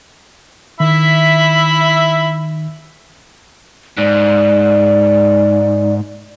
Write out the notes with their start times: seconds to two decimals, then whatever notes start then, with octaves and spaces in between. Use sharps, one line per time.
0.80 D#3 E4 E5 B5
3.98 G#2 D5